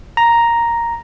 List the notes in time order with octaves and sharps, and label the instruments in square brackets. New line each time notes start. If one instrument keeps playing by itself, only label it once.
[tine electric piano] A#5